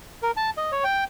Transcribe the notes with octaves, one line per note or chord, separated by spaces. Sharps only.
A#4
A5
D#5
C#5
G5